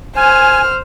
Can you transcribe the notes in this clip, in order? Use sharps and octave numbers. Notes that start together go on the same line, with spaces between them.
C5 G#5 F6